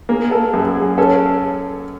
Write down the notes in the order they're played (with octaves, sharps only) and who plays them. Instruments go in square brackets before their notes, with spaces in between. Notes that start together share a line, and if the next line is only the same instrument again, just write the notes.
[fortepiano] A#3 [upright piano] G#4
[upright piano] A4
[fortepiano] F#2 [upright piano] G#4
[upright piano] G#4
[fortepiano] C#4 [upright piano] A4